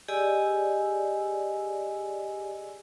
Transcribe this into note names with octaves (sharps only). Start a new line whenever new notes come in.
G4 G#4 D5 D#5 G#5 E6